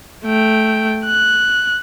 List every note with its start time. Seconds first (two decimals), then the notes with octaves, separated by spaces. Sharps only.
0.25 A3 G5
1.05 F#6